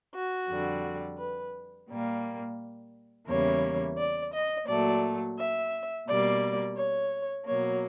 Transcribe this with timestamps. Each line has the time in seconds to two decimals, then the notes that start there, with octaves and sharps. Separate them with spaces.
0.15 F#4
0.49 F2 D3 G3
1.18 B4
1.89 A#2 G3 A#3
3.28 E2 C#3 E3 G3 A#3 C#5
3.99 D5
4.34 D#5
4.68 A#2 F#3 A3 D5
5.38 E5
6.08 B2 G3 A#3 D5
6.78 C#5
7.47 B2 F#3 A#3 C#5